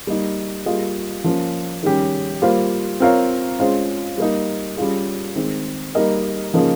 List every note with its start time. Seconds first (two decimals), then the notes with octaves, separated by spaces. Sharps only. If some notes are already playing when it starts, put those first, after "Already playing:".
0.07 G3 A#3 D#4
0.66 G3 A#3 F4 G#4 D#5
1.24 F3 A#3 C#4
1.83 D#3 G3 C#4 G4
2.42 G3 A#3 F4 C5
3.00 C4 F4 A#4 C#5 F5
3.59 G#3 C#4 F4 C5
4.18 G3 A#3 D#4
4.77 G3 C#4 F4 G#4
5.36 D#3 G#3 C4
5.95 G3 A#3 D#4 A#4 D#5
6.54 C#3 F3 A#3 D#4 G#4